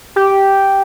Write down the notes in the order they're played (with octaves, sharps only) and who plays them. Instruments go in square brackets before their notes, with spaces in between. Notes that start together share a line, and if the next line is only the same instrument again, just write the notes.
[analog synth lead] G4